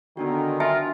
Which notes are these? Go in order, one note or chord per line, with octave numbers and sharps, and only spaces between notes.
D3 D#3 B3 D4 F#4
F4 E5 G#5 A5